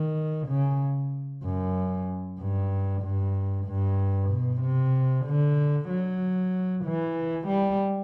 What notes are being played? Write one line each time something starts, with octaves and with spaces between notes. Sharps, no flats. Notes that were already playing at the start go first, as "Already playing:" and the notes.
Already playing: D#3
C#3
F#2
G2
G2
G2
B2
C3
D3
F#3
E3
G3